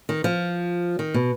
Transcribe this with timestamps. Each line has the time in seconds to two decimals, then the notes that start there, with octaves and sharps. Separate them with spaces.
0.09 D#3
0.24 F3
0.99 D#3
1.14 B2